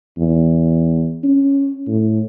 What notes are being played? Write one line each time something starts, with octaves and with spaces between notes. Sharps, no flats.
E2
C#4
A2